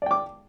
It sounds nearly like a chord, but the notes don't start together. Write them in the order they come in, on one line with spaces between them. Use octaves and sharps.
D5 G5 D6